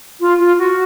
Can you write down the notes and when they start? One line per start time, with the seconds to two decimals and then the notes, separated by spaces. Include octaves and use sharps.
0.20 F4
0.39 F4
0.58 F#4